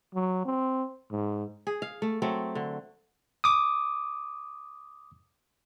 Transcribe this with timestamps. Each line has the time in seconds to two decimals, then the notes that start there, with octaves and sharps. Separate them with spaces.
0.15 F#3
0.45 C4
1.11 G#2
1.67 G#4
1.82 F5
2.02 A3
2.22 F#3 A3 C4
2.55 D3
3.44 D6 D#6